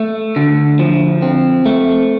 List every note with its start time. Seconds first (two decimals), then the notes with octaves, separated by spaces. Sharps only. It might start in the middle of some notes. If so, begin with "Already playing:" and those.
Already playing: A3
0.36 D3
0.79 F3
1.22 C4
1.66 A3